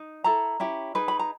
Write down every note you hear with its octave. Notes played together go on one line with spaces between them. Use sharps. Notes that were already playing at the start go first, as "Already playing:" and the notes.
Already playing: D#4
E4 A4 A#5
C#4 E4 G4
D#4 G#4 B4
B5
A#5